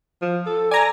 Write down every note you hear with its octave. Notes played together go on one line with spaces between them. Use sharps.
F3
A4
D5 G#5 A#5